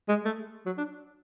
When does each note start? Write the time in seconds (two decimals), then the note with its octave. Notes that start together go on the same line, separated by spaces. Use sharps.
0.09 G#3
0.25 A3
0.66 F#3
0.78 D4